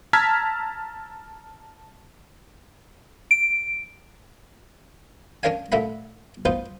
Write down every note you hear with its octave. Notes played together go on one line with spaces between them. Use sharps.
A5 A#5 E6 F6 G#6 B6
D7
C#4 D4 A#4 C#5 F5 G#5
A#2 A3 A#3 E5 F#5 B5
B3 D#4 F4 B4 C5